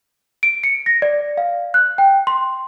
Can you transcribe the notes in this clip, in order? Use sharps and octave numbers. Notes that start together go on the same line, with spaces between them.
D7
C#7
A#6
D5
F5
F#6
G5
C6